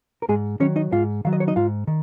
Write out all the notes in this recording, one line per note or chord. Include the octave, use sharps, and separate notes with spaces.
A#4
G#2 G#3 G#4
D#3 F#3 C#4 C#5
D#4 D#5
G#2 F4 F5
D#3 F#3 F5
D#5
C#5
D#4 D#5
G#2 F4 F5
D#3